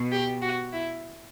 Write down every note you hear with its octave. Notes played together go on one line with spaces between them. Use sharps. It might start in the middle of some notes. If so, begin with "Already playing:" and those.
Already playing: B2
G4
F#4
E4